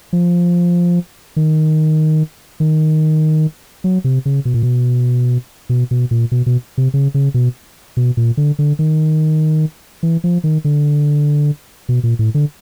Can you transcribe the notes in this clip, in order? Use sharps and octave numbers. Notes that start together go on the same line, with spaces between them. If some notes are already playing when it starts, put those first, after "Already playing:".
F3
D#3
D#3
F#3
C3
C#3
B2
A#2
B2
B2
B2
A#2
B2
B2
C3
C#3
C#3
B2
B2
A#2
D3
D3
D#3
E3
F3
D#3
D3
B2
A#2
A2
D3